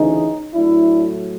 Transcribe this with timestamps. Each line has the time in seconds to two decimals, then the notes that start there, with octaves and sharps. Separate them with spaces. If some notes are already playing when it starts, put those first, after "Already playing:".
Already playing: D2 C#3 E3 C#4 D#4
0.53 A2 F#3 A3 D4 E4